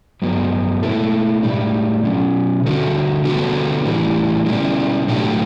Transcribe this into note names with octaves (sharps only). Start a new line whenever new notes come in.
G2 F#3 B3
B2 A3 E4 A4
A2 G3 D4
B2 F#3 C#4
D3 G3 D4 F#4 A4
D3 G3 B3 F#4 A4
A2 E3 G3
B2 G3 C#4 E4
A2 F#3 A3 D4 G4